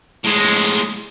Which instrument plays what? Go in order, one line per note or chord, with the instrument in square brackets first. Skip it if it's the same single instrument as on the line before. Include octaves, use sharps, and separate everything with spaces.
[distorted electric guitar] A2 G#3